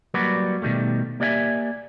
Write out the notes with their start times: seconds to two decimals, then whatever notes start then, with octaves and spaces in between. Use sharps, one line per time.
0.14 F#3 G3 A#3 F#4 B4 D5
0.62 B2 D#3 G3 A3
1.20 A#3 G4 D5 E5 F#5 G#5